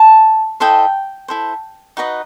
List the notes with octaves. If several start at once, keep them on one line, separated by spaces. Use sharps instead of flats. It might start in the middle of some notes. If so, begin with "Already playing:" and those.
Already playing: A5
E4 A4 C5 D#5 G5
E4 A4 C5
D#4 F#4 B4 D#5